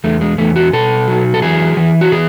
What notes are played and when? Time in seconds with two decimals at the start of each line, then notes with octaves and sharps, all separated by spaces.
0.04 E2 A3
0.21 G#3
0.38 E2 A3
0.56 F#4
0.73 B2 A4
1.08 F#3
1.34 A4
1.42 E3 G#4
1.77 E3
2.01 F#4
2.12 E3 G#4